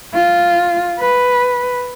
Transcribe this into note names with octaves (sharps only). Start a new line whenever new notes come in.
F4
B4